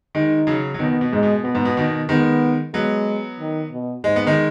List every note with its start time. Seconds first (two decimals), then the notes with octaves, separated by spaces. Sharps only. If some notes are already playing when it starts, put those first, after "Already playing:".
0.15 D#3 G#3 D#4
0.47 C#3 F#3
0.74 F#3
0.79 B2 D#3 B3
1.01 B2
1.12 G#2 G#3
1.23 B2
1.44 B2 B3
1.55 G#2
1.65 B2
1.77 B2 D#3
2.09 D#3 G#3 B3
2.74 F#3 G#3 B3
3.39 D#3
3.72 B2
4.04 G#2 G#3
4.16 B3
4.26 D#3 G#3